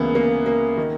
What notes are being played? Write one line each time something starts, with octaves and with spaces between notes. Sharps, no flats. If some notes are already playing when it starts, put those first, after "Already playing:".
Already playing: D2 C#3 E3 G#3 A#3 B3
A#3
A#3
D#3